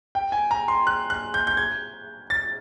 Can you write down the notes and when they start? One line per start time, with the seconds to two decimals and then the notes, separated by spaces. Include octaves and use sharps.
0.15 G5
0.32 G#5
0.51 A#5
0.68 C6
0.87 F#6
1.10 F#6
1.34 G6
1.47 G6
1.57 G#6
2.30 A6